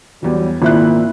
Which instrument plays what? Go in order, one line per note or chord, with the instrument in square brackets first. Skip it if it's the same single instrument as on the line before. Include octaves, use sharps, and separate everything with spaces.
[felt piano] E2 E3 [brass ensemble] F#3 G3
[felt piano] G#1 E5 F#6 [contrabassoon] A#2 [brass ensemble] E4